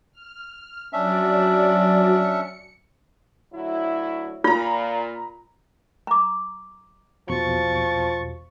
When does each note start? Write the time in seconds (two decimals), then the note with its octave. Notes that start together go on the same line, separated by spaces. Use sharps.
0.12 F6
0.93 F#3 C#4 D4 F#4 D5 E5
2.10 C#7
3.54 D2 F#3 E4
4.44 A#2 F4 A#5 B5
6.07 A#5 D6
7.29 A#1 E2 B2 F3 C#6 A6